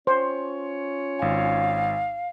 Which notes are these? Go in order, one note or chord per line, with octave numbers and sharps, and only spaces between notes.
C#4 F4 C5 C#5
G#1 F5 G#5